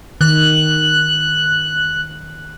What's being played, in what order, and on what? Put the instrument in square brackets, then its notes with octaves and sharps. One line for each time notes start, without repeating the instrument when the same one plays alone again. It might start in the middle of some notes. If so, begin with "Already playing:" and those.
[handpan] D#3 [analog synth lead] F#6